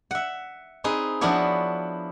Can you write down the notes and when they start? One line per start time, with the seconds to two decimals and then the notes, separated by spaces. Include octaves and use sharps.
0.11 E5 F#5
0.84 C4 D#4 G#4 B4
1.21 F3 B3 D4 E4 F#4 C#5